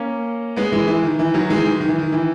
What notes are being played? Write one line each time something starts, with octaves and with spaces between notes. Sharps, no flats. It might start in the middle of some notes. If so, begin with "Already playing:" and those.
Already playing: A#3 C#4
G#3 B3
E3 G#3
E3
D#3
E3
D#3 F#3
E3 G#3
D#3
D#3
E3
D#3
E3